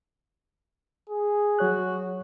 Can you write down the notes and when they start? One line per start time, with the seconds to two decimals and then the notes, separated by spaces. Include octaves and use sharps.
1.10 G#4
1.59 F#3 F#4 C#5 F#6